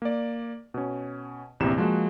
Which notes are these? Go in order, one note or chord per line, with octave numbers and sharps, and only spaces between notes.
A#3 D5
B2 C#4
A#1 E2 C3 E4 E7
F3 G#3 A#3 F#4